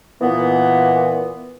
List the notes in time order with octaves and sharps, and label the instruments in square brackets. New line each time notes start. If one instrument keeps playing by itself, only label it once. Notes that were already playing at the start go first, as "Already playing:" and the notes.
[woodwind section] A#2 E3 B3